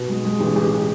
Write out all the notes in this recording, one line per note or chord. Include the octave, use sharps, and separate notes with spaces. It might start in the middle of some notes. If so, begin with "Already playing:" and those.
Already playing: B2
G#3
G#3
A1
A1